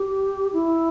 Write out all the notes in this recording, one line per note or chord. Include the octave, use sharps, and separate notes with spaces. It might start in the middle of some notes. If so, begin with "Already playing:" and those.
Already playing: G4
E4